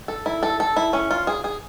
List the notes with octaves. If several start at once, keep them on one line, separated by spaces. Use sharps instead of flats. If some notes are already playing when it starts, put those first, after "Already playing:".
A4
E4
A4
A4
E4
C#4
F4
G#4
G#4